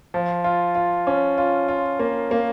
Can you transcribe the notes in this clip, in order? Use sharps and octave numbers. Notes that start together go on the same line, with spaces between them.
F3
F4
F4
C#4
F4
F4
A#3
A#3